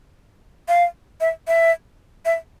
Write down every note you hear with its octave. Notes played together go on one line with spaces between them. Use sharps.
F5
E5
E5
E5